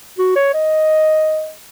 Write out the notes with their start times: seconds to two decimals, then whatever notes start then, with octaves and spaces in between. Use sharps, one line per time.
0.18 F#4
0.36 C#5
0.54 D#5